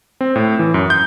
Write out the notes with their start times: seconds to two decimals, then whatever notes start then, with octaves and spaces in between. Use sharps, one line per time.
0.21 C4
0.36 A2
0.59 E3
0.74 F#2
0.90 G6